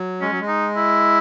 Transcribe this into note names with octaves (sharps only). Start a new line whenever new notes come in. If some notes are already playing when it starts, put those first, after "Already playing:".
Already playing: F#3
G#3 C#4
F#3
G#3
D#4
E4